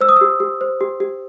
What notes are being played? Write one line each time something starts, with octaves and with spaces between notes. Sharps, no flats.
C5 E6
D#6
G4 E6
G4
C5
G4
G4